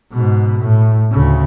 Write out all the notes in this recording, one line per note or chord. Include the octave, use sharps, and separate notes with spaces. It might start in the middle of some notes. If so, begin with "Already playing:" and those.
G#2 B2
A2
D2 C#3